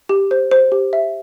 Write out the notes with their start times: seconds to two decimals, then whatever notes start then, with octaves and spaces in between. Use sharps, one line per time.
0.09 G4
0.31 C5
0.51 C5
0.72 G4
0.93 E5